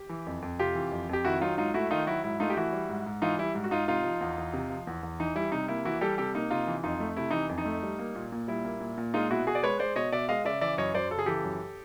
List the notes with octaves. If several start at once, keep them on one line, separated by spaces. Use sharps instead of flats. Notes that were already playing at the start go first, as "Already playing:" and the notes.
Already playing: G4
E3
F2
F2
C3 F4 G4
E3
F2
F2 G4
D#3 E4 F#4
F#3 D#4 F4
G#2 D#4 F4
A3 E4 F#4
D#3 D#4 F4
F#3 E4 F#4
G#2 E4
A3 D#4 F4
G4
E3 E4 F#4
G3
G#2
G#2
E3 D#4 F4
G3 E4
G#2
F#4
G#2 D#4 F4
C3 D#4 F4
F3
E2
E2
C3
F3
E2
E2
E3 D#4
G3 E4
C3 D#4
A#3 E4
E3 E4 F#4
G3 G4 A4
C3 G4 A4
A#3 D#4
C3 D#4 F4
E3
F2 D#4 F4
A3
C3 E4
E3 D#4
F2
D#4
A3
G3
A#3
A#2
A#2
G3 E4
A#3
A#2
A#2
G#3 D#4 F4
B2 E4 F#4
B2 F#4 G#4
D5
G#3 B4 C#5
G#3 C5 D5
B2 C#5 D#5
B2 D5 E5
G#3 D#5 F5
C#3 D5 E5
E3 D5 E5
F#2 C#5 D#5
F#2 C5 D5
C#3 A4
G#4
E3 G4 A4
F#2